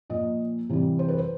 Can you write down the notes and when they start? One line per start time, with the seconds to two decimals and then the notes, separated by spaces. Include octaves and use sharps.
0.10 A#2 F3 D#5
0.69 C3 E3 G3
0.99 C5
1.09 B4
1.18 C5